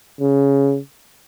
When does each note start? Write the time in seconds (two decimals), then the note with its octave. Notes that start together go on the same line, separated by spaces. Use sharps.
0.21 C#3